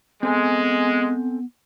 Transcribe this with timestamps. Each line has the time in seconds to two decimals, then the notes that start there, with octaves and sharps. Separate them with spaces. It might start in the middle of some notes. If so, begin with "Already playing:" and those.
0.23 G#3 B3 C4 A4 G#5